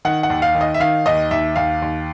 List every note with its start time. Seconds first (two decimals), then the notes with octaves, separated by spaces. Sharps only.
0.05 D#3 F#5
0.23 F#5
0.30 D#2
0.42 F5
0.55 D#3
0.61 D#5
0.74 E5
0.80 D#3 F5
1.06 D#2 D#5
1.31 D#2 E5
1.56 D#2 F5
1.82 D#2